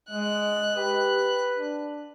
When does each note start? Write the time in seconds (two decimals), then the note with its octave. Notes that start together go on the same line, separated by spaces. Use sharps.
0.11 G#3 D#5 F#6
0.76 G4 B4
1.58 D4